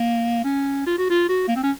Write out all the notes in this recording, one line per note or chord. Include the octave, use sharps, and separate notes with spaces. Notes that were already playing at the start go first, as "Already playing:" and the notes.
Already playing: A#3
C#4
F4
F#4
F4
F#4
A#3
C4
C#4